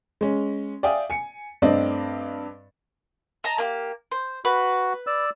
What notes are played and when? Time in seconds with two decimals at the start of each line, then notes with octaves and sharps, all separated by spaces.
0.21 G#3 C#4
0.83 D5 E5 F5 G5 G#5 D#6
1.10 G#5 C#7
1.62 G2 A3 C4 D5 D#5
3.44 D#5 A5 A#5
3.58 A#3 F4 G4
4.12 C5
4.45 F#4 B4
5.07 D5 E6